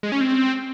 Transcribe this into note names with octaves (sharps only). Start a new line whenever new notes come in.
G#3
C#4
C4